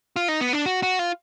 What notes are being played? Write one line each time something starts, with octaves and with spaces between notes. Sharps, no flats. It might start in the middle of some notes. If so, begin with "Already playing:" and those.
F4
D#4
B3
D4
F#4
F#4
F4